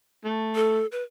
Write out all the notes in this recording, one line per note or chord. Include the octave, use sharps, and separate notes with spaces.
A3
A4
B4